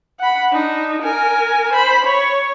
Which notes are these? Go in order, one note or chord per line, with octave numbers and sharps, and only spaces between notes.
F#5 B5
D4 D#4
A#4 G#5
C5 B5
C#5